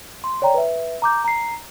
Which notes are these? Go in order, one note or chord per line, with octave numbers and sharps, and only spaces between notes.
C6
C#5 D5 G5 A#5
B4 E5
A#5 D6 G6
A#5 C7